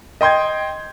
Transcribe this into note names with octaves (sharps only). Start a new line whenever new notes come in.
D#5 G5 C6 G6 G#6